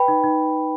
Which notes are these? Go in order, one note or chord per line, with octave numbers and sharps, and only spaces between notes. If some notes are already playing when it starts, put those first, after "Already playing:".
Already playing: B4 G5 B5
D#4
D#4